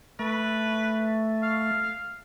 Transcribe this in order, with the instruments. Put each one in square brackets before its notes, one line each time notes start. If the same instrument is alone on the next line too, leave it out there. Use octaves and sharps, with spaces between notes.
[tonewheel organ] A3 [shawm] B4
[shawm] F5